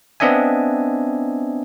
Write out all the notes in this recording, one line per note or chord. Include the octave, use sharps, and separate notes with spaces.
B3 C4 D4 D#5 E5 G#5